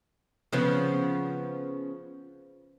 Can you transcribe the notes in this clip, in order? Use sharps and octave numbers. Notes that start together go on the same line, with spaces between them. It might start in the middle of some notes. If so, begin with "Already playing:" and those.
C#3 F3 B3